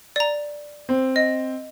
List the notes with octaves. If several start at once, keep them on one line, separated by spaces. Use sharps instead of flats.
D5 A#5
C4
D#5